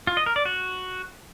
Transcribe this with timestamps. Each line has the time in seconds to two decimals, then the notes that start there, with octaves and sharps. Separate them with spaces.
0.07 F4
0.17 D#5
0.26 A#4
0.36 D5
0.45 F#4